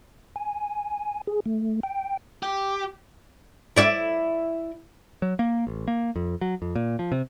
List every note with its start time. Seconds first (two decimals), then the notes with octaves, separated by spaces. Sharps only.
0.36 G#5
1.27 G#4
1.46 A3
1.83 G5
2.43 G4
3.76 E4 D5 E5
5.22 F#3
5.39 A#3
5.67 A1
5.88 A#3
6.16 F2
6.41 F#3
6.62 F2
6.76 A#2
6.99 F3
7.12 C3